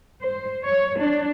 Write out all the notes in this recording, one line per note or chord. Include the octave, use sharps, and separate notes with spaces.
C5
C#5
D4